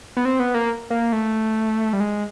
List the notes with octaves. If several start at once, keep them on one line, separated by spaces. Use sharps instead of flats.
B3
C4
B3
A#3
A#3
A3
G3
G#3